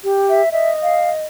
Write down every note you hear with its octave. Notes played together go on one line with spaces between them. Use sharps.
G4
E5
D#5 E5
F5